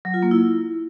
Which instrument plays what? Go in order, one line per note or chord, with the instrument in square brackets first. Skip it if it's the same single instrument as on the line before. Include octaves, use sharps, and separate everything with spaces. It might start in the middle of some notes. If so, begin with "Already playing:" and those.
[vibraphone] F#3
F4
A#3
E4